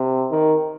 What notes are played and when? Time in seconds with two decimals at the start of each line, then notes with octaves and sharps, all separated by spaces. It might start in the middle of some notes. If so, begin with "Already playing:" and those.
Already playing: C3
0.31 D#3